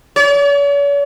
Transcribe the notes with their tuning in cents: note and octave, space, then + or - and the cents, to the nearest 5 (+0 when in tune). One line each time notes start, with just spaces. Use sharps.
C#5 +45